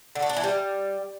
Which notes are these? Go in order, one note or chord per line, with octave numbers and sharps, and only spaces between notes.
D3
A3
D4
E3
G3